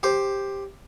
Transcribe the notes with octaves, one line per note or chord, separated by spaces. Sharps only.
G4 C5